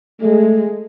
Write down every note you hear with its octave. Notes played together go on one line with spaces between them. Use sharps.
G#3 A3